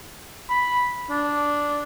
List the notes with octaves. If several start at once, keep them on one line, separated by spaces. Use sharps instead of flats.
B5
D4